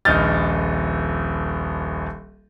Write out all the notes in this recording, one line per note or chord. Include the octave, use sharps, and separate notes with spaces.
D#1 A#1 D#5 F6 G6 A6